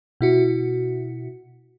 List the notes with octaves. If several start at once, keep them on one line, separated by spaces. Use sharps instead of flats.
B2 E4 F#4